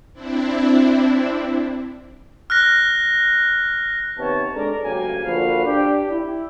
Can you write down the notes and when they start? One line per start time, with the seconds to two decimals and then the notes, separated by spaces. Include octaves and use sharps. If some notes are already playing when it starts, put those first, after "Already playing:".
0.13 C4 D4 E4
2.50 F6 F#6 A#6
4.18 C3 D#3 B3 C#5 A5
4.54 G#3 D4 A4 A#4 D5 A#5
4.84 D2 C#3 F#3 A#3 G4 G#5
5.23 A#2 D3 F3 F#4 B4 F5
5.66 D4 G4
6.10 E4